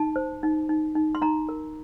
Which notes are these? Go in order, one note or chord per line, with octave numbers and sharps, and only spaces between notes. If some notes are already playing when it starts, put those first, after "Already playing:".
Already playing: D#4 A5
C5
D#4
D#4
D#4
C6
D#4 A#5
A#4